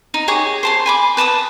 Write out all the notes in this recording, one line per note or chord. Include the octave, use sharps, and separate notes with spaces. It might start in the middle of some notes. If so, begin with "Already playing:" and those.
D#4
G4 G#4 C#5 D#5
C5 A5 C6
G#5 B5 D6
B4 A5 D6 D#6